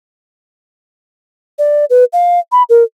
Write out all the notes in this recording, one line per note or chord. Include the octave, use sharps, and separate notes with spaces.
D5
B4
F5
B5
A#4